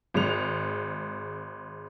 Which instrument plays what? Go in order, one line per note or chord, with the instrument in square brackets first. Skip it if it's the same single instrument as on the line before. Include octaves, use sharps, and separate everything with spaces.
[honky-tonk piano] G#1 G#3 F7